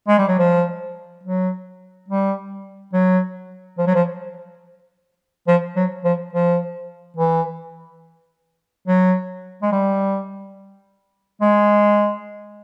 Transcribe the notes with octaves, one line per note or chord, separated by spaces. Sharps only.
G#3
G3
F#3
F3
F#3
G3
F#3
F3
F#3
F3
F3
F#3
F3
F3
E3
F#3
G#3
G3
G#3